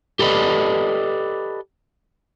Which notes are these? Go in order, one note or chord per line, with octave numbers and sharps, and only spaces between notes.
G4 A4 B4 D5 D#5